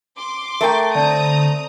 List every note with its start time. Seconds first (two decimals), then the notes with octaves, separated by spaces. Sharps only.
0.18 C6 D6
0.61 A3 A#4 E5 G5 A#5 D7
0.95 D3 C4 D5 A5 A#5 D#6